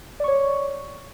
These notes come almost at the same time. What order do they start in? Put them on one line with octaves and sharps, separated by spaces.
D5 C#6 C#5